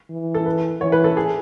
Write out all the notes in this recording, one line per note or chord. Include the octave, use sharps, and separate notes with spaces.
E3
A4
B4
E3 C#5
B4
A4
G#4